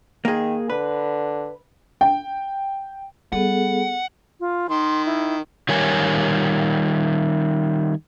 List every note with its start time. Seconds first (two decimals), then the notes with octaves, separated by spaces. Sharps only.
0.25 D#3 A#3 G#4
0.70 D3 B4
2.01 G5
3.32 G3 B3 G#4 A4 F#5
4.40 F4
4.69 D#3 C6
5.06 E4
5.69 D#3 G3 A#4 C#5 G#5